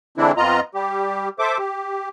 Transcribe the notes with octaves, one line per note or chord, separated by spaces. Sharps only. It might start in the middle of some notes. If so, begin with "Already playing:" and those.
D3 E3 G#3 C4 D4 E4
F2 B3 F4 D#5 A#5
G3 G4
A4 C5 E5 D6
G4